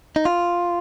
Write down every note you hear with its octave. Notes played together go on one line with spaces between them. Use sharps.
D#4
F4